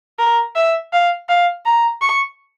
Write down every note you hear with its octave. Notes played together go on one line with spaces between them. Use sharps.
A#4
E5
F5
F5
A#5
C#6